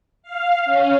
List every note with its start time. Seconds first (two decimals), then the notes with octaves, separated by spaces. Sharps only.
0.23 F5
0.65 C#4